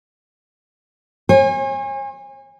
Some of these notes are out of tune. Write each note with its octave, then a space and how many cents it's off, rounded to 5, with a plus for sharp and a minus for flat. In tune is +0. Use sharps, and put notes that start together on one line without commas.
C#5 -45 G#5 -30